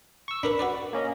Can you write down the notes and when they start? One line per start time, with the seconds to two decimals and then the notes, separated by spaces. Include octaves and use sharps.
0.28 C#6 E6
0.43 D4 A#4 B4 B5
0.59 F#4 B4 D5
0.93 A#3 C#4 D#5